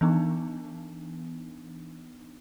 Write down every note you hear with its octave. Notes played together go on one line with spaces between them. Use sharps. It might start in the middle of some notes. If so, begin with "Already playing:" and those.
E3 B3 D4 D#4